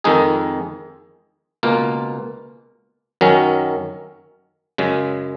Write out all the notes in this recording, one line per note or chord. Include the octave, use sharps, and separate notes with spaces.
F2 D#3 G#3 D#4 G#4
C#2 B2 A#3 F4
F#2 D#3 F#3 C#4
F#2 C#3 G#3